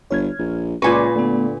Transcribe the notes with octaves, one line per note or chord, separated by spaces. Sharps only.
G1 C#5 F6 G#6
A#1
C#2 A#2 F4 B4 G#5 C#6 A#6
D3 A3 B3